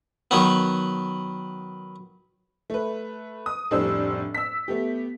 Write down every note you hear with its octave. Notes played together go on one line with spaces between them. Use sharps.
D#3 F#3 B3
A3 B4
D#6
F1 A2 G3 D4 C5 E6
E6 B6
A3 B3 G4